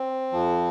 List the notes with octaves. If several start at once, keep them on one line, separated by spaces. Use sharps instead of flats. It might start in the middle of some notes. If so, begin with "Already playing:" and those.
Already playing: C4
F2 F3